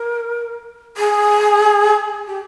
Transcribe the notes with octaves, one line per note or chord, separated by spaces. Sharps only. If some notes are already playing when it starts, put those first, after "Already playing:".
Already playing: A#4
G#4
G4